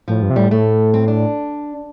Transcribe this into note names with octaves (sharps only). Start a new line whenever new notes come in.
A2 F3
G2
C3
A2 G3
A2 A3
C4
D4